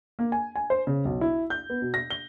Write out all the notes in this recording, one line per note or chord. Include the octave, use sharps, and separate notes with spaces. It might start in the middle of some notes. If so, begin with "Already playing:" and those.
A#3
G#5
G#5
C5
C#3
B1
E4
G6
B3
B2
A#6
G7